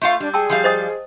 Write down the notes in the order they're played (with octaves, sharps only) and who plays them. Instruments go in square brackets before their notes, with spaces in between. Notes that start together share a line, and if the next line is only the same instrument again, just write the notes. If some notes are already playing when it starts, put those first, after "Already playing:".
[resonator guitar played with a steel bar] A3 F4 F5
[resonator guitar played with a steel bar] G3 [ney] D4
[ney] G#4 [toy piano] G5 A5 E6
[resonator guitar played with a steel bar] F3 G3 F5
[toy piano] C5 D#5 D#6